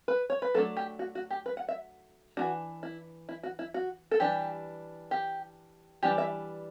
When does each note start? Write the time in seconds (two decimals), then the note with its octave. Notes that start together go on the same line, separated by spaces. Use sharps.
0.08 B4
0.30 C#5
0.42 B4
0.54 F#3 A3 D4 A4
0.77 G4
0.99 F#4
1.15 F#4
1.31 G4
1.46 B4
1.57 F#5
1.69 E5
2.37 E3 A3 D4 F#4
2.83 E4
3.29 E4
3.43 F#4
3.59 E4
3.74 F#4
4.11 A4
4.20 E3 G3 D4 G4
5.11 G4
6.03 E3 G3 D4 G4
6.18 E5